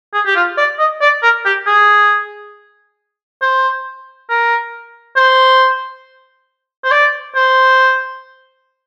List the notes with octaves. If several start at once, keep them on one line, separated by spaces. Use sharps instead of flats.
G#4
G4
F4
D5
D#5
D5
A#4
G4
G#4
C5
A#4
C5
C5
D5
C5